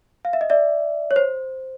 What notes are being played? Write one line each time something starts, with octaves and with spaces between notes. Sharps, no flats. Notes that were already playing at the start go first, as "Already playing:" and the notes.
F5
E5
D#5
D5 E5
C#5
C5